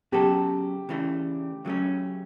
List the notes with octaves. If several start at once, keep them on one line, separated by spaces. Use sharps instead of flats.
C#3 F#3 B3 F#4 G4 A4
C#3 E3 A3 D4
C#3 F#3 A3 C#4